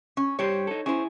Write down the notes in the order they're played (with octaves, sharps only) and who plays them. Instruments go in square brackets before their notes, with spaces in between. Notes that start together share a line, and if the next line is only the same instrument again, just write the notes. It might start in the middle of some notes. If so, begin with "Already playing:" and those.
[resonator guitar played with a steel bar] C#4
[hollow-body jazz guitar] G2 G4 C5 [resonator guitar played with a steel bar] C#5
[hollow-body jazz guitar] D#4 A4
[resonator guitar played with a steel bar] C#4 C5 [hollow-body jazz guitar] E4 G#4